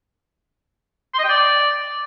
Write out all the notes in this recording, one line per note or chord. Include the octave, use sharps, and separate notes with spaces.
C6
D#5
G5
D5